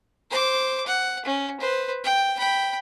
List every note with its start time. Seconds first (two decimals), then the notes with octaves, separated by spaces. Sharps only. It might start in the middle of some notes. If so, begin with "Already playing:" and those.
0.31 C5 D6
0.87 F#5
1.25 C#4
1.60 B4 C5
2.04 G5
2.38 G5 B5